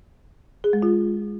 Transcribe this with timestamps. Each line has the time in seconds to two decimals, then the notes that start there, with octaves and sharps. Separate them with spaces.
0.64 G#4
0.73 G#3
0.82 F4